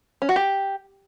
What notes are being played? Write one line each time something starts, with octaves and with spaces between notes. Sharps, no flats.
C#4
F#4
G4